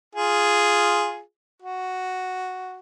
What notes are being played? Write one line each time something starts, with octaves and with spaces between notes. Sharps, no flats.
F4 G#4
F#4